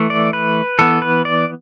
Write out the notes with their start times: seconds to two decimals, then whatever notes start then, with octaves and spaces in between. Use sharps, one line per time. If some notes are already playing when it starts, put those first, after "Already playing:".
Already playing: E3 A3
0.10 D5
0.33 B4
0.79 E3 B3 A4
1.02 B4
1.25 D5